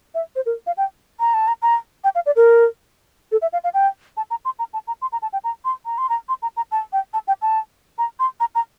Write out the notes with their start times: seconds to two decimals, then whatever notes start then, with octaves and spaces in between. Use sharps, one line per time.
0.14 E5
0.36 C5
0.46 A#4
0.67 F5
0.77 G5
1.20 A#5
1.34 A5
1.48 A#5
1.62 A#5
2.04 G5
2.15 F5
2.26 D5
2.36 A#4
3.32 A4
3.42 E5
3.53 F5
3.64 F5
3.74 G5
4.17 A5
4.30 A#5
4.45 C6
4.59 A#5
4.73 A5
4.87 A#5
5.02 C6
5.12 A#5
5.22 A5
5.33 G5
5.44 A#5
5.65 C6
5.85 A#5
5.98 C6
6.09 A#5
6.29 C6
6.42 A#5
6.57 A#5
6.71 A5
6.93 G5
7.13 A5
7.27 G5
7.42 A5
7.98 A#5
8.19 C6
8.40 A#5
8.55 A#5